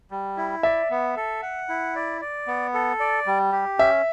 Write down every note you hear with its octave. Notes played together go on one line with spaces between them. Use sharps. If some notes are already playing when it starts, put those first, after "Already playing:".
G3
E4
D5 E5
B3
A4
F#5
E4
D5
D5
B3
A4
D5
G3
G4
C#4 E5